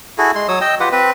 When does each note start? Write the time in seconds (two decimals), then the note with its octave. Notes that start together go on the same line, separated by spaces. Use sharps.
0.18 E4 F#4 G#4 A4
0.35 G#3 C6
0.48 F#3 C#5 D#6 E6
0.61 D#5 G5 E6
0.80 F4 G4 B4 F#5
0.92 C4 B4